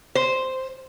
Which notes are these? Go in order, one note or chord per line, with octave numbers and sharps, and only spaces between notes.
C5